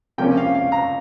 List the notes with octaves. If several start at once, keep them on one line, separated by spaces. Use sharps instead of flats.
C3 F3 A#3 C#4 G5
F5
F5
A#5